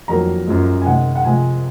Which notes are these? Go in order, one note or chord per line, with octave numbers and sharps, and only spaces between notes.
F2 D#3 F#3 A#3 A#5
F#2 F3 G#3
G#5
C3 D#3 G#3 F#5
F#5
C3 F3 G#3 G#5